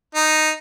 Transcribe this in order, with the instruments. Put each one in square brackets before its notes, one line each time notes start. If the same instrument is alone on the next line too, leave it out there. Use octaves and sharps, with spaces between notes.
[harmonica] D#4